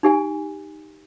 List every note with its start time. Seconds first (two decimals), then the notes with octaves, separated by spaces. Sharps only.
0.03 D#4 G4 G#5